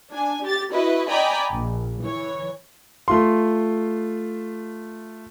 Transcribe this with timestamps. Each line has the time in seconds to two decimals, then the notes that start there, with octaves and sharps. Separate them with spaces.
0.11 D4 G#5
0.42 G4 A6
0.72 E4 F#4 B4 D#5
1.09 D5 D#5 G5 G#5 A#5 B5
1.51 A#1
2.01 E3 C#5
3.08 A3 F4 C6